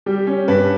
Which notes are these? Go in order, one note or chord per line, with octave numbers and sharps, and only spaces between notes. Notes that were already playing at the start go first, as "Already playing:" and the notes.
G3 G4
C#4
G2 B4